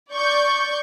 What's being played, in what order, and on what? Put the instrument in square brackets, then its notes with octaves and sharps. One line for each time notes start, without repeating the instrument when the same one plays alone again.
[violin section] D5 C#6 G6